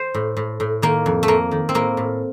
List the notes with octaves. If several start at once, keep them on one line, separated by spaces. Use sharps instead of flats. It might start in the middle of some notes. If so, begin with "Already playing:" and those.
Already playing: C5
A2
A2
A2
D#3 A#3
F2
A3
F2 A#3
D#3
C4
A2 A#3
A2